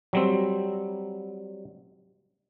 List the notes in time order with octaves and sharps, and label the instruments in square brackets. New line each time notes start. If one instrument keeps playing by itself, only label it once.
[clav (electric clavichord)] F#3 G3 C4